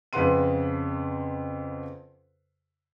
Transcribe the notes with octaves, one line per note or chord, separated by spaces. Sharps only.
F2 C#3 B4 F#5 C6 D#7